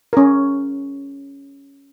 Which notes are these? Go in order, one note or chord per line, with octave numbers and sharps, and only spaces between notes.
C#4 A#4